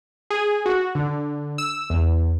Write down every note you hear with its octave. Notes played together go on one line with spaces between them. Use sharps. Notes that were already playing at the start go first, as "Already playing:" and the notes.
G#4
F#4
D3
E6
E2